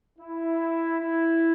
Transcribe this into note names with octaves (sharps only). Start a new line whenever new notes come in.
E4
E4